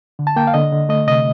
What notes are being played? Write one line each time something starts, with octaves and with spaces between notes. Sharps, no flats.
D3
A5
A#3 G5
F5
D3 D#5
D3
A3 D#5
C3 D#5